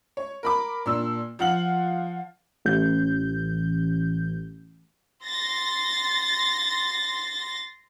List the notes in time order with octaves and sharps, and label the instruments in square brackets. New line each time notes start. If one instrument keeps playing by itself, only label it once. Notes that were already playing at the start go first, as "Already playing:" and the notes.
[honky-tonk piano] C#5
A#4 B5 D6
A#2 D4 E6
F3 F4 F#5 F6 F#7
[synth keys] A1 G6
[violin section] C6 A6 A#6